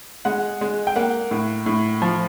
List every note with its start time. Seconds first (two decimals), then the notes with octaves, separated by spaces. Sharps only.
0.25 G#3 F#5
0.61 G#3
0.87 G5
0.96 A#3 F#5
1.31 A2
1.66 A2
2.02 F3